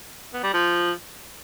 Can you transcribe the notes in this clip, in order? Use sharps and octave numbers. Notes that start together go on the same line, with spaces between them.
B3
G3
F3